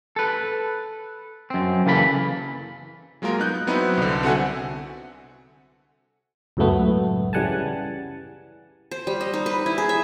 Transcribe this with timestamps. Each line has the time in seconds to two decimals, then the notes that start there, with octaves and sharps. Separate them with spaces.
0.16 A4 B4
1.50 F#2 C4
1.86 C#3 E3 A#3 A4 C#5 B5
3.22 F#3 G#3 A#3 F4 A#4
3.39 B3 D#4 F#6 G6
3.67 F#3 B3 C4 D#4 E4 B4
3.97 C2 D3
4.23 C4 F#4 A4 E5 F#5 G#5
6.57 C#2 F#2 A2 A3 B3
7.33 C#3 E3 G3 F#5 G#5 A5
8.91 C5
9.07 G3
9.21 D#5
9.34 D#4
9.46 B4
9.66 E4
9.78 G#4
9.89 E5